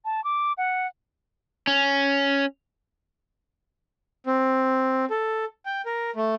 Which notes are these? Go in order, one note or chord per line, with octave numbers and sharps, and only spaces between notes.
A5
D6
F#5
C#4
C4
A4
G5
A#4
A3